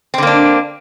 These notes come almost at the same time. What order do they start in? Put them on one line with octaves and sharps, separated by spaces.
C4 D3 A#3 D4